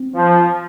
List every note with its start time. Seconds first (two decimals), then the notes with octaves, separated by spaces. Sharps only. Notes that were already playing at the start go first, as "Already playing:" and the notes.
Already playing: C4
0.15 F3